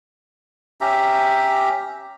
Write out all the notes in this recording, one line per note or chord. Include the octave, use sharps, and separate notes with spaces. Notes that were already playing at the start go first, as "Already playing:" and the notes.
C#4 G4 E5 A#5